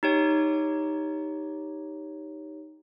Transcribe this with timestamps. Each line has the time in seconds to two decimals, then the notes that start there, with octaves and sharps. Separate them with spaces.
0.03 D#4 G4 C#5